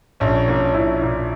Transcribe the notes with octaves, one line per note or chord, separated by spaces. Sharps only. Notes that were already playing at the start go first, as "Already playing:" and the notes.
A#1 C#4
A#2
C#4
A#1 E4
A#2